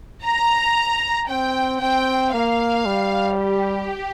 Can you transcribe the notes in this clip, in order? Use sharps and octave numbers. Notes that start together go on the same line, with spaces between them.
A#5
C4 G5
C4 G5
A#3 F5
G3
G4